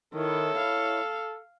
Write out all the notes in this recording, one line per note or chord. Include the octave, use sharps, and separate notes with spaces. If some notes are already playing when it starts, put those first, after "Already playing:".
D#3 E4 A4 C#5
F5